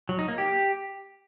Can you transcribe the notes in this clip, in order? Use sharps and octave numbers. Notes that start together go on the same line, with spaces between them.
F#3
D#4
A#3
G4